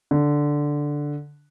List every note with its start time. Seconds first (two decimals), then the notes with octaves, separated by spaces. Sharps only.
0.11 D3